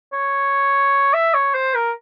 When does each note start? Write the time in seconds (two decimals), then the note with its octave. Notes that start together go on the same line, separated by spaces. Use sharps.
0.13 C#5
1.13 E5
1.34 C#5
1.54 C5
1.75 A#4